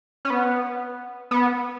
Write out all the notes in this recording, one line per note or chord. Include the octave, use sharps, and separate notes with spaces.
C#4
B3
B3